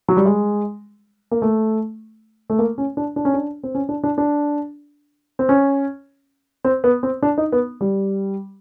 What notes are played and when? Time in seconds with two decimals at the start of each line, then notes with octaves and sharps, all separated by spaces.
0.09 F#3
0.17 G3
0.26 G#3
1.31 A#3
1.42 A3
2.50 A3
2.59 A#3
2.78 C#4
2.97 D4
3.16 D4
3.25 C#4
3.34 D4
3.63 C4
3.75 C#4
3.89 D4
4.04 D4
4.18 D4
5.39 C4
5.49 C#4
6.64 C4
6.84 B3
7.03 C4
7.23 D4
7.38 D#4
7.52 B3
7.81 G3